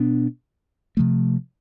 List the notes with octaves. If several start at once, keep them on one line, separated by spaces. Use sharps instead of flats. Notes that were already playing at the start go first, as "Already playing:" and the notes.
Already playing: B2 B3 D4
C3 F3 A3